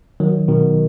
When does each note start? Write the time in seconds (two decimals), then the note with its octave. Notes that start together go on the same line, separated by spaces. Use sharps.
0.20 D#3 F#3
0.48 B2 D#3